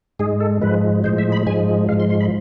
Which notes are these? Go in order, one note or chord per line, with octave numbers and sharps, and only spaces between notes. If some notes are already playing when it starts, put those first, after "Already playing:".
G#2 G#3 G#4
A4
G#2 F3 G#3 B4
A2 F3 G#3 C5
E5
B5
G#2 F3 G#3 G#5
G#2 F3 G#3 F5
C6
C6
B5